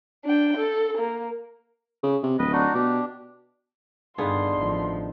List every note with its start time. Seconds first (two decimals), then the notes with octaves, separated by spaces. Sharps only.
0.25 D4 G5
0.57 A4
0.97 A#3
2.03 C#3
2.23 C3
2.39 D1 B4 D#5
2.53 D4 D#4 F#4
2.74 B2 D4 G4
4.18 G2 D3 D#3 B3 F4 G#4 C6
4.58 A1 F3